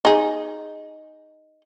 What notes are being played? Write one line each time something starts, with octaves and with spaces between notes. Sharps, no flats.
D#4 G#4